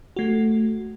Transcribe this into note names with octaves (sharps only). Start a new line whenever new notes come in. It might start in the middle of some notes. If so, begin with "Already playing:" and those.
A3 F#4